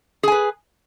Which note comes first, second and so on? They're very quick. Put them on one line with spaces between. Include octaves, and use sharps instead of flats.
G#4 G#5 B4